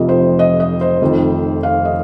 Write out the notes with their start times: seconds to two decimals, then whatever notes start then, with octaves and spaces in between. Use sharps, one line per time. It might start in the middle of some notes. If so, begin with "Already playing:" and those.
Already playing: F1 F2 C3 F3 D#5
0.09 C5
0.39 D#5
0.60 D#5
0.81 C5
1.01 F1 F2 D#3
1.63 F5
1.85 D#5